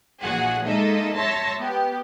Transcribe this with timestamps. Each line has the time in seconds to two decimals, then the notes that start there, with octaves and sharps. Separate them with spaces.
0.21 A#1 A#2 E3 F#4 G#4 F#5
0.66 G#3 A#3 D#4 A4 D#5 E5
1.16 C#5 E5 A5 C6 A#6
1.58 B3 G4